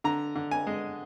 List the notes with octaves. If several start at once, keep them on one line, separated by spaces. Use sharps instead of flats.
D3 A#5
D3
G#5
G#3